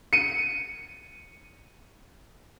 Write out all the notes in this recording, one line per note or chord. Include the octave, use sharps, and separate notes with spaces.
C#7 D#7